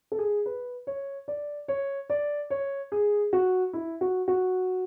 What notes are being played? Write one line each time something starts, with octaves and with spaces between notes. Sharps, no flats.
A4
G#4
B4
C#5
D5
C#5
D5
C#5
G#4
F#4
E4
F#4
F#4